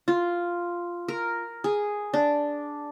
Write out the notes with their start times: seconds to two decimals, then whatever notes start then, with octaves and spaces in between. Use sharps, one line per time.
0.08 F4
1.08 A#4
1.64 G#4
2.14 D4